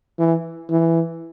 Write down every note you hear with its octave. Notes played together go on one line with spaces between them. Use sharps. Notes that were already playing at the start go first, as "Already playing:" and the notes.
E3
E3